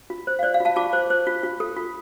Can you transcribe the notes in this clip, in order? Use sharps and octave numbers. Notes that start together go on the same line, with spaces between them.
F4
C5
F5
C5 D5
F5
F4
F5 A5
F4 A5 D6
C5
C5
F4
F4
A4
F4